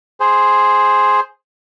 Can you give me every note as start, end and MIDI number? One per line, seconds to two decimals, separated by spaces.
0.20 1.20 68
0.20 1.20 72